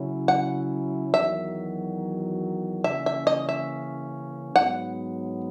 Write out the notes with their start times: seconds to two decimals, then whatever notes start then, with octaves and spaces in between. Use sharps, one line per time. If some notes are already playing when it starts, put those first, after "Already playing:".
Already playing: C#3 F#3 C#4 E4
0.28 F#5
1.14 E2 D#3 F#3 E5
2.84 C#3 E3 A#3 C#4 E5
3.06 E5
3.27 D#5
3.49 E5
4.56 G#2 F#3 B3 F#5